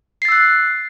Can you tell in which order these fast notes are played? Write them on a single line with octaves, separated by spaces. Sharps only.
C7 A6 E6 F#6